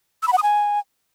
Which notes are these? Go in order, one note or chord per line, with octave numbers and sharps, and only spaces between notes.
E6
B5
F#5
D#6
G#5